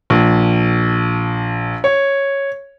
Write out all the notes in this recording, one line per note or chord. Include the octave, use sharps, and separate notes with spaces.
A#1
C#5